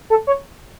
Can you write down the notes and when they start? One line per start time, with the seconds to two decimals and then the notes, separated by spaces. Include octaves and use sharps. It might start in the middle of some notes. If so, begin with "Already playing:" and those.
0.10 A4
0.27 C#5